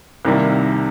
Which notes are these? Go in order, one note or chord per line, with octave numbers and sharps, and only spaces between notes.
C2 C3 D#3 G3 A#3